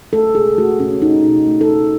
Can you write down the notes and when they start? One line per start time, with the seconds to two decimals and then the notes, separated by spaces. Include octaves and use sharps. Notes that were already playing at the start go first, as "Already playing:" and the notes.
0.13 A3 A4
0.35 B2 G#4
0.58 A3 F#4
0.80 B2 C#4
1.02 B2 D#4
1.24 B2
1.47 A3
1.61 A4
1.68 A3